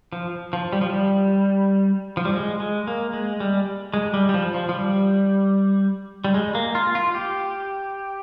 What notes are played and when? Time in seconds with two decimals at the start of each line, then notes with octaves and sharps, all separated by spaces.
0.13 F3
0.53 F3
0.73 G3
0.81 F3
0.90 G3
2.17 F3
2.25 G3
2.33 G#3
2.60 G#3
2.87 A#3
3.13 G#3
3.40 G3
3.94 G#3
4.14 G3
4.29 G3
4.34 F3
4.54 F3
4.69 F3
4.74 G3
6.25 G3
6.34 G#3
6.55 A#3
6.75 F4
6.95 F4
7.15 G4